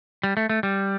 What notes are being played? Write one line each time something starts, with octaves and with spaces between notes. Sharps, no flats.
G3
A3
A3
G3